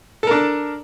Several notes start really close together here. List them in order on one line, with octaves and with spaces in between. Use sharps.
A4 A#4 D4